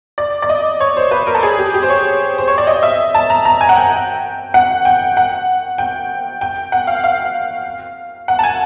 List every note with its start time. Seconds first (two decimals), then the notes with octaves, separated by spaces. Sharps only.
0.18 D5
0.42 D5
0.49 D#5
0.80 C#5
0.97 C5
1.11 B4
1.27 A#4
1.35 A4
1.43 G#4
1.58 G4
1.74 G4
1.83 C5
1.90 C#5
2.38 C5
2.48 C#5
2.58 D5
2.67 D#5
2.83 E5
3.15 A5
3.30 A#5
3.45 A#5
3.61 G#5
3.69 F#5
3.76 G5
4.54 F#5
4.85 G5
5.17 F#5
5.78 G5
6.41 G5
6.72 F#5
6.87 F5
7.04 F5
8.28 F#5
8.39 A5
8.43 G#5